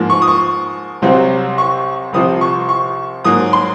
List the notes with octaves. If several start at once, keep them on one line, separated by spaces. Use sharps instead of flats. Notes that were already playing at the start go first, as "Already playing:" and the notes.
Already playing: G#2 F3 A#3
C#6
D#6
C#6
C2 C3 F#3 C4
C#6
C2 C3 F3 C4 D#6
C#6
C#6
G#2 F#3 A#3 D#6
C6